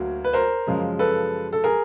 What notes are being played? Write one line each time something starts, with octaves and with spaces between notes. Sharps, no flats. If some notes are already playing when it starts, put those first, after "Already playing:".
Already playing: D2 F#3 A#3
B4
A#4 C5
F#2 C#3 F3 G#3
A4 B4
A4
G#4 A#4